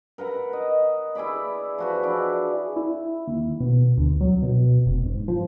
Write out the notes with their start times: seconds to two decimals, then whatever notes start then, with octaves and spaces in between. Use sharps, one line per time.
0.18 A#4 B4 F#5 A#5
0.53 D#5
1.15 E4 G#4 D5 B5
1.78 F3 F#4 B4
2.03 D4 E4 G#4 D5
2.76 E4
3.27 D#2
3.60 B2
3.97 D2
4.21 F#3
4.42 B2
4.86 F1
5.06 G#2
5.28 F3